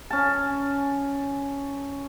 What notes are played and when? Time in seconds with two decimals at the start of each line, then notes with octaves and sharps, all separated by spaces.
0.10 C#4 A5